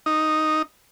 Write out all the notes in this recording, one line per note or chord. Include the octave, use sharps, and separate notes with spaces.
D#4